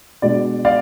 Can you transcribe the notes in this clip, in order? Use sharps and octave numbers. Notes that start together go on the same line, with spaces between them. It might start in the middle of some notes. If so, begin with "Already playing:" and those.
B2 G#3 D4 D5
D5 F5